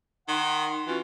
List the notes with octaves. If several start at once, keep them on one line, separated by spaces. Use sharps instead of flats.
D#3 F#5 C6
E3 C#4 F4 F#4